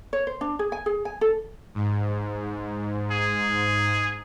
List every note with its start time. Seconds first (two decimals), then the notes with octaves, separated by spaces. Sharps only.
0.13 C#5
0.27 C5
0.41 D4
0.59 G#4
0.72 G#5
0.86 G#4
1.05 G#5
1.21 A4
1.75 G#2
3.11 G#4